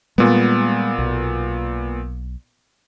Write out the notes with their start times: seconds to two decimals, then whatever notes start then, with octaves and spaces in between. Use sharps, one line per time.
0.18 A#2 G3 G#3 B3
0.99 B1